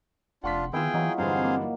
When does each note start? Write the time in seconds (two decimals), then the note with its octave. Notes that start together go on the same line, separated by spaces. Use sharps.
0.44 F1 D4 F4 F#5 C6 B6
0.73 D#3 B3 E4 F4 G#4 G5 E6
0.94 E3 F#3 D#4
1.18 G2 D3 E3 C4 G#4 C5 F5
1.44 A#3